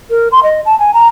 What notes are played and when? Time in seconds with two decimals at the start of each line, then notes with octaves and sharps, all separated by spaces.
0.10 A#4
0.32 C6
0.43 D#5
0.66 A5
0.80 G#5
0.94 A#5